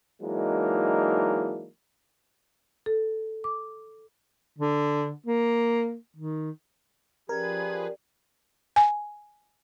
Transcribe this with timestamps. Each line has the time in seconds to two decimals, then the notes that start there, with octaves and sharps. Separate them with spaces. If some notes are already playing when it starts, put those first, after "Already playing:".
0.22 E3 F#3 G#3 A#3 D4 D#4
2.86 A4
3.44 D6
4.58 D3
5.26 A#3
6.16 D#3
7.29 F3 C#4 G4 G#4 A#4 B4 D5 G#6
8.76 G#5